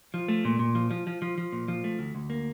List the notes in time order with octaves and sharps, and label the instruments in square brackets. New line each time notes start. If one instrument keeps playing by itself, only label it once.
[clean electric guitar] F3
A3
A#2
A#2
F3
F3
F3
F3
F3
A#2
F3
A3
D2
D2
A#3